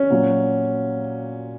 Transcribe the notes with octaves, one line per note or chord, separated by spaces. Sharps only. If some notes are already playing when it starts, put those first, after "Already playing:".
Already playing: C#4
A#2 F#3